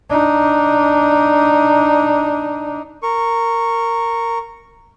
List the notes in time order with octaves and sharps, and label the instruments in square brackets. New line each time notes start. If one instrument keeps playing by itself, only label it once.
[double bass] D4 D#4
[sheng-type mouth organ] A#4 C#6